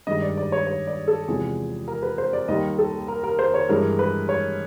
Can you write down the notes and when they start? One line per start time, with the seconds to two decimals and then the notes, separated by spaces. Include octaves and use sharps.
0.07 G2 D#3 G#3 D#5
0.22 D5
0.37 D5
0.52 C#5
0.67 C#5
0.87 D5
1.08 A4
1.28 E2 C3 F3 G#3 G#4
1.88 A#4
2.02 B4
2.18 C5
2.33 D5
2.48 D#2 D#3 G3 D#5
2.78 A4
3.08 A#4
3.24 A#4
3.39 C5
3.54 C#5
3.69 G2 E3 G#3 A#4
3.99 B4
4.29 C#5